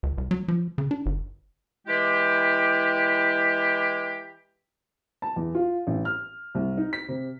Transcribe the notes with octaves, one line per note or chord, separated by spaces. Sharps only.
C#2
C2
F#3
F3
C#3
D4
G1
E3 G#3 E4 G4
A5
E2
F4
A1
F6
C2
D#4
B6
C3